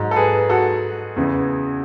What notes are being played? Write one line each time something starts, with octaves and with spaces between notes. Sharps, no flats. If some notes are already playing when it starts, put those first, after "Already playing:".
Already playing: G#2 F#3
A4
G#4 B4
F#4 A4
E2 C#3 E3